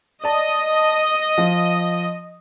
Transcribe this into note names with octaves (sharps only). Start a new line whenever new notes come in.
D5 D#5 A5
F3